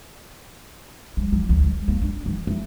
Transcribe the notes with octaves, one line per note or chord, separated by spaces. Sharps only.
G3
F3
D2
G3
A#3
D4
E3
A3